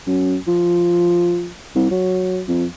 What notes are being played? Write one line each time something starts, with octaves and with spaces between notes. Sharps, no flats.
F#2
F3
C2
F#3
F2